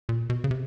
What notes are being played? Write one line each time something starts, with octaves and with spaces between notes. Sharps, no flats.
A#2
B2
C#3
C3